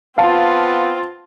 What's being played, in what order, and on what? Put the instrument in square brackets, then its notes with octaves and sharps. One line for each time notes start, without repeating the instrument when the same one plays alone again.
[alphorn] B3 [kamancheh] C4 F4 [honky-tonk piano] F5 A5